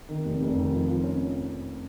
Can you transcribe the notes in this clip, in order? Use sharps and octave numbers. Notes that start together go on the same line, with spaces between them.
D#3
F1
F1
D#3
F3
F3
C#4